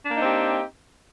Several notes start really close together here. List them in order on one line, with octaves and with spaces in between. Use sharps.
D4 A#3 D#4 C4 G4